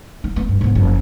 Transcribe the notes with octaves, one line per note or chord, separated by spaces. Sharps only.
D#4
B3
G2
G#2 B3
F#1 F3